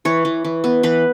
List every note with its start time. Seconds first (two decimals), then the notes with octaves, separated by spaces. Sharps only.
0.05 E3 C#5
0.25 E3
0.45 E3
0.64 B3
0.83 E3 B4